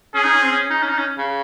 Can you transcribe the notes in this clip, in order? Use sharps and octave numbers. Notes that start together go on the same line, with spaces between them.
C#4 G#4
D#4
C#4
C4
C#4
D#4
C#4
D#4
C#4
C#3